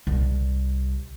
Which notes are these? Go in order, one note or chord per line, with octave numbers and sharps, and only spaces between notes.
C2